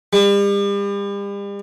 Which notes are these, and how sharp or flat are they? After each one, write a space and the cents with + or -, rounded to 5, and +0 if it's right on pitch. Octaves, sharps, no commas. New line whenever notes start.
G3 +40